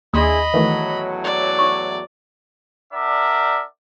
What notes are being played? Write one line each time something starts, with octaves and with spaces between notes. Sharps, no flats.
D#2 D4 E4 G#4 D#5 B5 C6 D#6
E2 A2 D#3 E3 F#3 A3 E5
D5
C#6
D4 A#4 D5 E5 F#5 D6